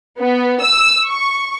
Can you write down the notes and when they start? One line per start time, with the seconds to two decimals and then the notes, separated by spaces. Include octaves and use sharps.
0.20 B3
0.62 E6
1.07 C#6